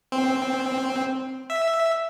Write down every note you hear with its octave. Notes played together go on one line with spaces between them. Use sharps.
C4
E5